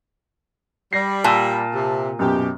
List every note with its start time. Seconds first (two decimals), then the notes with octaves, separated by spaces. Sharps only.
0.93 G3 A#6 C7
1.24 A#2 A5 E6
1.73 C3
2.19 F#2 B2 G4